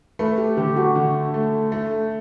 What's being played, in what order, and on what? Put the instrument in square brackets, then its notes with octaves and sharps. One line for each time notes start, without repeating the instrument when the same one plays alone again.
[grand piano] A3 [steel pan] B4
[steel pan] G4
[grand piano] D3 [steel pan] G4
[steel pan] F#4
[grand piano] D3
A3
A3